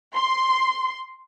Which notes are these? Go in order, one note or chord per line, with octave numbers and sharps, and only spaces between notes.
C6